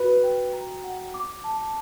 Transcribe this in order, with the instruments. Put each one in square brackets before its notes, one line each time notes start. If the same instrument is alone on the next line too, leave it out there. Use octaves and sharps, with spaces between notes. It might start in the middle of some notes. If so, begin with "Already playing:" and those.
Already playing: [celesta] F#4 [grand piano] B4
[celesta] G5
A#5
F#5
D6
A5